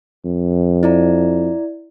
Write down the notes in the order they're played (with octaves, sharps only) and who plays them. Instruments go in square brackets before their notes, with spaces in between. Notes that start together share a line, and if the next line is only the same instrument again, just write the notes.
[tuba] F2
[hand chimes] E4 D5 A#5